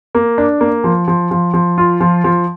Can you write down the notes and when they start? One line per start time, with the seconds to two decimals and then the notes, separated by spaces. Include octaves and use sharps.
0.15 A#3
0.38 D4
0.61 A#3
0.84 F3
1.08 F3
1.31 F3
1.53 F3
1.78 F4
2.00 F3
2.24 F3